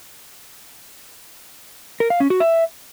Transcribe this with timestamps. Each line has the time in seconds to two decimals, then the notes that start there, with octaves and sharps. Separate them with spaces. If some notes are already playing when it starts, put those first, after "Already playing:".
2.00 A#4
2.10 F5
2.20 C#4
2.30 F#4
2.40 E5